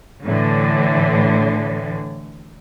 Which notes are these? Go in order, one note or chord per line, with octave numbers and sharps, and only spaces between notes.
A2 D3 E3